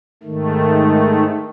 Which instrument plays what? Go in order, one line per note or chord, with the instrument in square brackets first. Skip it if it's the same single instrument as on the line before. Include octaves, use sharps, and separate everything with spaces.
[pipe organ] G#2 D#3 A3